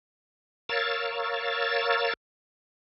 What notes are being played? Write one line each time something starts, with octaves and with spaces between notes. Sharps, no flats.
A#4 C#5 F5 E6 A6